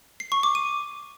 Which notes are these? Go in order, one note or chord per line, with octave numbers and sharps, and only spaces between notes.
C7
C#6
D6
D#7